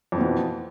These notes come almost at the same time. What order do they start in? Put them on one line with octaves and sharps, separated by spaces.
F2 E3 B2 B3